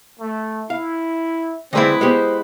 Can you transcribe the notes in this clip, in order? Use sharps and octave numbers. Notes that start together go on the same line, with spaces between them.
A3
E4 F5
D3 G#3 C4 E4 B4 D#5
G#3 B3 G4 C5